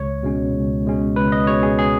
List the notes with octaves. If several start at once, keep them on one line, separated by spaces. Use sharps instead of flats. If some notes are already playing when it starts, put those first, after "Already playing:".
Already playing: C#2 C#5
B2 G#3 C#4
C#2
B2 G#3 C#4
C#2 B4
D#5
B2 G#3 C#4 C#5
G#4
G#4